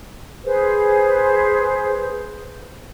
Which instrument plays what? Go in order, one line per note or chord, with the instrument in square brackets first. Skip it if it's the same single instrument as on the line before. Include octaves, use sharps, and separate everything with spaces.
[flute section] G#4 B4 C5